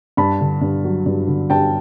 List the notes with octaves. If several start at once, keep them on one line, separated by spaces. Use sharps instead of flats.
G2 A5 B5
D3
G2
F#3
G2
D3
G2 G5 A5